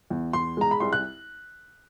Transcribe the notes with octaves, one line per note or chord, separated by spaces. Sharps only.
E2
E2 C6
G#3 A#5
B5
C2 C6
F#6